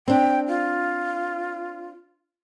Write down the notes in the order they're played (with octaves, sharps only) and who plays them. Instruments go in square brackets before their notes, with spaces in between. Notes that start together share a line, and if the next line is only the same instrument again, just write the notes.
[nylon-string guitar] C4 D4 [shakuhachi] G5
[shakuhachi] F4